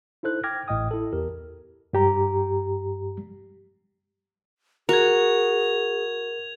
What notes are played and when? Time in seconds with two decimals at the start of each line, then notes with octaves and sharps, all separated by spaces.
0.23 D#4 E4 A4 C5 F#6
0.44 G5 D6 F6 G#6 A#6
0.68 A1 A2 D#5 G5 D#6
0.91 E4 A4
1.13 E2 G4 A#4
1.93 G2 G4 A#5
4.89 F#4 G#4 A#4 G#6 F7